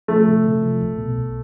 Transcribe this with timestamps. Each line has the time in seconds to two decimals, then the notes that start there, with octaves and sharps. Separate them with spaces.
0.08 F3 A3
0.27 C3
0.45 C3
0.63 F3
0.82 B1
0.98 B2
1.17 B1